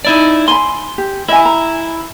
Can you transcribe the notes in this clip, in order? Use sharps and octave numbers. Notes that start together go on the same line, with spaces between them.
D#4 E4 D5
G#5 B5 C6
G4
E4 D#5 E5 G#5
A#5